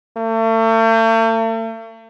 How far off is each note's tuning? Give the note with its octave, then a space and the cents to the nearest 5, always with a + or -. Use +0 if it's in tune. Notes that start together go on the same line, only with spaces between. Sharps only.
A3 +40